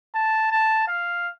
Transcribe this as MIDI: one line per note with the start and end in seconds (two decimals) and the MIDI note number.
0.15 0.50 81
0.51 0.85 81
0.88 1.29 77